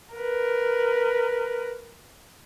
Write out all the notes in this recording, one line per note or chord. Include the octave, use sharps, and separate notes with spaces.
A#4 B4